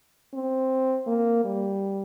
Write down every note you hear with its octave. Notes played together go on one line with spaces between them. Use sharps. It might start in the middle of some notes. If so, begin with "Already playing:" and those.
C4
A#3
G3